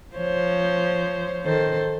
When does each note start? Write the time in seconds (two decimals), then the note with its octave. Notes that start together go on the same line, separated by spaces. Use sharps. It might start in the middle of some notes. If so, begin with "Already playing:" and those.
0.16 F3 C5 C#5
1.44 D#3 A4 C5